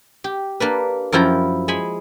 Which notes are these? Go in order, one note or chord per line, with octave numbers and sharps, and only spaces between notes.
G4
A#3 D4 B4
F#2 F3 E4 G5 A#5
G#3 G#5 B5